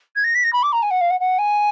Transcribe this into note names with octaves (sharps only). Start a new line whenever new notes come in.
G#6
A#6
B6
A#6
B5
D6
A#5
G#5
F#5
F5
F#5
F#5
G#5